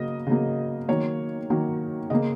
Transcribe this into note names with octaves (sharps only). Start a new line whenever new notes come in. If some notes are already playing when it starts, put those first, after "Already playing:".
Already playing: C#3 F#3 A#3 D#5
C#3 F#3 A#3
D#3 F#3 A#3 C#5
D#3 F#3 A#3
C#3 A#3 D#5